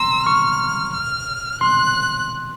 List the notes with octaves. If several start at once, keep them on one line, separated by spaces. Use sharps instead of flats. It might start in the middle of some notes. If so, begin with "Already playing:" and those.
Already playing: A#5 C6 E6
C#6 F6
F6
C6 F#6